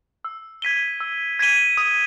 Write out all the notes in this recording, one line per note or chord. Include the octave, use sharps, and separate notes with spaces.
E6
G#6 B6 D#7 G7
E6
G#6 B6 D#7 G7
D#6